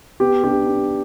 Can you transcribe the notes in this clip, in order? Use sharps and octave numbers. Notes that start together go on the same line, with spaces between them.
B3 G4
D4 G4
D4